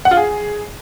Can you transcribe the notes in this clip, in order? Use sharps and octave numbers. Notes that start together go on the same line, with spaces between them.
F#5
F4
G#4